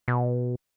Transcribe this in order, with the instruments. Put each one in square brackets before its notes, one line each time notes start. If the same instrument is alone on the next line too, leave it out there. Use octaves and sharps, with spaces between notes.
[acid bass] B2